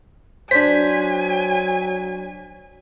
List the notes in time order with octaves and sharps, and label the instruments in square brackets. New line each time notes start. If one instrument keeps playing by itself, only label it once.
[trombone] F#3 [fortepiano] D4 C5 [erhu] G#5 [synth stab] B6